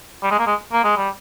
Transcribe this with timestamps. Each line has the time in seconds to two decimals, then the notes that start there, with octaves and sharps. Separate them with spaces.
0.22 G3
0.31 G#3
0.39 A#3
0.47 G#3
0.73 A#3
0.84 G#3
0.97 G3